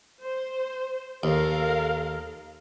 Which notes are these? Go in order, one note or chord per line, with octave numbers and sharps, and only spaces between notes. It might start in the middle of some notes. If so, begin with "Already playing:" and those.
C5
D#2 A4 A#4 F5